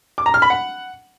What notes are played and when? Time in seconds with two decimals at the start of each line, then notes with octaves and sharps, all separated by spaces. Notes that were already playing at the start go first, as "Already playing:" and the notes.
0.18 D6
0.26 A#5
0.34 F6
0.42 B5
0.50 F#5